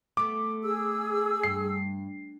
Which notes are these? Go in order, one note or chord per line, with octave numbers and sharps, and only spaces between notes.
A3 B3 D6
G#4 E6
G2 C7